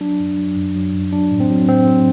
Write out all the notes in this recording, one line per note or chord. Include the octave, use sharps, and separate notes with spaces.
F#3 D4
F#2
F#3
F#2
F#3
F#2
F#3 D4
A2
C4
F#3
A2 C4
F#3